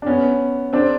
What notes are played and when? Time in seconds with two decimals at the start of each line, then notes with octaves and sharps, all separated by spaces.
0.02 D4
0.06 B3 C#4
0.73 C4 D4